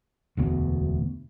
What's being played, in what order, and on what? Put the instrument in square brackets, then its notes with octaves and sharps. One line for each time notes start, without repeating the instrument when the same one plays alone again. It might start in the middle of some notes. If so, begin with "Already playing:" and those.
[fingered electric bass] E1 D2 B2